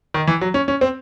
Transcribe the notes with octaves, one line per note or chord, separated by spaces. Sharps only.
D#3
E3
F#3
C#4
C#4
C4